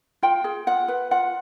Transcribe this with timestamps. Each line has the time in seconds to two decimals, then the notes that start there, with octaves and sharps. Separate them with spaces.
0.23 F4 G5
0.44 G#4
0.67 F4 F#5
0.88 B4
1.11 F4 F#5